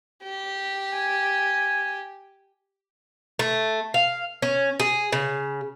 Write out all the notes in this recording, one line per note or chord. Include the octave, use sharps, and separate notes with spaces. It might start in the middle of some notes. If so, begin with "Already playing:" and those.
G4
G#5
A3
F5
C#4
G#4
C#3